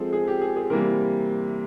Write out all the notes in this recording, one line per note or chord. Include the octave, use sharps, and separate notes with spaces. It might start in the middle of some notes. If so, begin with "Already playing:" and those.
Already playing: F3 G#3 C4 G#4 A4
G#4
G4
G#4
G#4
C3 E3 G3 A#3 A#4